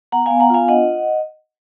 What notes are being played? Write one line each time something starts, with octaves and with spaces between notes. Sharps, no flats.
B3 F#5 A#5
B3 F5 G#5
F#5 A#5
F4 F5 G#5
D4 D#5 F#5